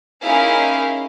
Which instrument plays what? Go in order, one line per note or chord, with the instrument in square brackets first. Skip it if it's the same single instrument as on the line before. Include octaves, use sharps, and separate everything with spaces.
[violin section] A#3 C#4 D#4 E4 G#4 F5